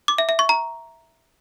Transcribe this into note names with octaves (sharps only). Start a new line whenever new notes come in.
D6
E5
E5
C#6
A#5